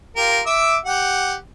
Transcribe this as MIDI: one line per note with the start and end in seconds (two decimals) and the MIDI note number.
0.16 0.40 65
0.16 0.40 67
0.16 0.40 70
0.46 0.77 76
0.46 0.77 86
0.46 0.77 88
0.85 1.35 67
0.85 1.35 78